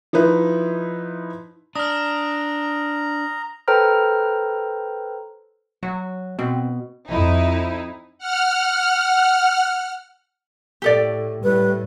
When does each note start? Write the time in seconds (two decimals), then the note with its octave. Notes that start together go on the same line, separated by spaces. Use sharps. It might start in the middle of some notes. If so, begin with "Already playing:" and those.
0.13 F3 D#4 E4 B4
1.76 D4 A#5 D#6 F6
3.68 A4 B4 C5 G5 A#5 F6
5.83 F#3 F#4
6.39 B2 C4
7.07 F2 D#4 E4
8.18 F#5 F6
10.82 A2 G4 A4 D5
11.43 A2 G3 B4